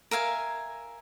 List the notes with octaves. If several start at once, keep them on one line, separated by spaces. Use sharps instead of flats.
A#4 E5 F5 G#5